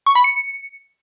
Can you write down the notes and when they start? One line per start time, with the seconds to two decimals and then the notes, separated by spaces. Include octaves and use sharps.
0.06 C#6
0.15 B5
0.24 C#7